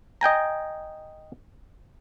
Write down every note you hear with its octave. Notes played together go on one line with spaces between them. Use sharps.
D#5 G5 G#5 A#5